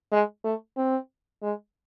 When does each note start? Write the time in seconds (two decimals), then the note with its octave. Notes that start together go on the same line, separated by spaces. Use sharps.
0.12 G#3
0.44 A3
0.77 C4
1.42 G#3